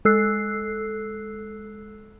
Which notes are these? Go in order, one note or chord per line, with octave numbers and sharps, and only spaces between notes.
G#3 A4 E6 F#6 C7